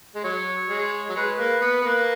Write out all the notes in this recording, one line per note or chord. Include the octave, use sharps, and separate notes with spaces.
G#3
F#3 C#5
G#3
F#3
G#3 B4
A#3
B3
B3
A#3